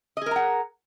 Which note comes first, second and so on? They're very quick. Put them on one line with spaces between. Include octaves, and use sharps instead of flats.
D#5 G#4 A#4 A#5 F#5